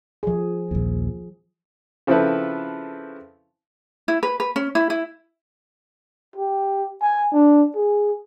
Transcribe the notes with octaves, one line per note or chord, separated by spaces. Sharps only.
F3 G#4
A#1 D#2
C#3 F3 C4 E4 A4 B4
E4
B4
B4
C#4
E4
E4
G4
G#5
D4
G#4